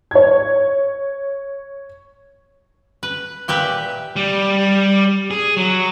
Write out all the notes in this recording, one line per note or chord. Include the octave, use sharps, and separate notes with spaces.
C#5 G#6
B4
A#2 G4 B4 E5
G3
G#4
F#3